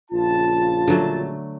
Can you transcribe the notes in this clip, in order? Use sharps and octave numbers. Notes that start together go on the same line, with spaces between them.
A#1 C#3 F4 A5
D3 F#3 A3